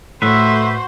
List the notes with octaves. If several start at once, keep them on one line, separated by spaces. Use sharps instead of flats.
A2 A3 F#4 B4 C5 E5